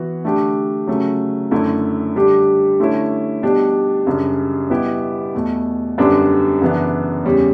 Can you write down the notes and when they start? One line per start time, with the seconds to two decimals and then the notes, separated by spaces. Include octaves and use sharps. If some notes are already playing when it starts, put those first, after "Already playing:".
Already playing: E3 B3 F#4
0.25 D3 A3 D4 G4
0.87 C#3 F#3 A3
1.51 F#2 D3 A3 E4
2.16 D3 G3 D4 G4
2.80 D3 A3 C#4 E4
3.43 B2 G3 D4 G4
4.07 F#2 C#3 G3 D4
4.70 B2 G3 B3 E4 G4
5.34 E2 B2 A3
5.98 F#2 D3 G3 B3 D4
6.62 F#2 C#3 E3 B3 D4
7.25 E2 C#3 G3 C#4